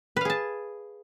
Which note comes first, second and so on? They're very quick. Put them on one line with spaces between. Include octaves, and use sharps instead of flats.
B4 F5 G#4 A5